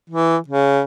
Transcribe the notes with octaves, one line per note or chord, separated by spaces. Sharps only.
E3
C#3